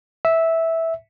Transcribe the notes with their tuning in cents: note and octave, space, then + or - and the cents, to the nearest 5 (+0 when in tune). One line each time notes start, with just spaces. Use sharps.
E5 -10